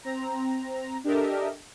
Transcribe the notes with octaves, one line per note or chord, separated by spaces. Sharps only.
C4 A#5
D4 G4 A4 A#4 D#5 E5